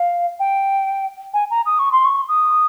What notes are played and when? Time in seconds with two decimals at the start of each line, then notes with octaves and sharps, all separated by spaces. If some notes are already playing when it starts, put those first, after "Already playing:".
Already playing: F5
0.39 G5
1.33 G#5
1.50 A#5
1.66 D#6
1.79 C#6
1.92 C6
2.05 C#6
2.28 D#6